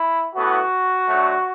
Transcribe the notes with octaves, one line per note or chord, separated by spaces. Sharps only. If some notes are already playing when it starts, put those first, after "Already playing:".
Already playing: E4
A2 E3 B3 F#4
D3 F#3 A3